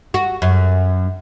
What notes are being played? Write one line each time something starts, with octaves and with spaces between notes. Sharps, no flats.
F#4
F#2